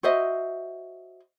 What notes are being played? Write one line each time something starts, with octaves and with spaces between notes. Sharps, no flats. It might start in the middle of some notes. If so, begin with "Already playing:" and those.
F#4 C5 D#5 E5